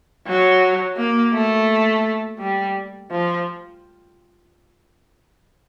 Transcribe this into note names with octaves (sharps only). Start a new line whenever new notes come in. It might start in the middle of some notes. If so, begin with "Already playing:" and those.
F#3
A#3
A3
G3
F3